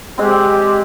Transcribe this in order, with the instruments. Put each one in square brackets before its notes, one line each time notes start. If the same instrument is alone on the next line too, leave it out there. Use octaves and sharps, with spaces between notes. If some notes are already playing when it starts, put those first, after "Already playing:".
[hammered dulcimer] G#3 C4 [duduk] G4